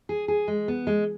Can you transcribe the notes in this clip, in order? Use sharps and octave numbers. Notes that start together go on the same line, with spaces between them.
G#4
G#4
G#3
B3
G#3